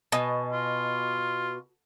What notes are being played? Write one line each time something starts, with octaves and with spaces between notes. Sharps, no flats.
B2 D#5 G#5 A5
F4